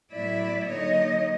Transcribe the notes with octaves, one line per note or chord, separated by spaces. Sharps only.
A2 F#3 B3 E4 D5 E5
D3 F#3 A#3 D#4 C#5 D#5